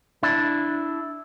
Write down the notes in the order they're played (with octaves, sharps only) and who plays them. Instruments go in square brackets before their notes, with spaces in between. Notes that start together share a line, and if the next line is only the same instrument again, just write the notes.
[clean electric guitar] D4 E4